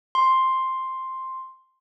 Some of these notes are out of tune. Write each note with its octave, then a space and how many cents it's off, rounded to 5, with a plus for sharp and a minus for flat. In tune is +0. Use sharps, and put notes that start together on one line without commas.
C6 +5